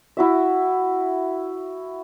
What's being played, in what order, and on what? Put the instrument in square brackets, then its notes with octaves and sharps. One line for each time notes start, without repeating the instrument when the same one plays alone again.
[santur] E4 F#4 E5